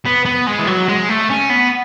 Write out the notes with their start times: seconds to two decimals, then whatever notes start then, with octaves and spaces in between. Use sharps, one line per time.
0.05 B3
0.25 B3
0.47 G#3
0.59 E3
0.67 F#3
0.88 G#3
1.09 A3
1.30 C#4
1.50 B3